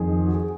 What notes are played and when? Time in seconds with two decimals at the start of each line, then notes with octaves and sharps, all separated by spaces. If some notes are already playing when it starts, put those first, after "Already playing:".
Already playing: F2 D#3 G#4
0.27 F#4
0.34 G#4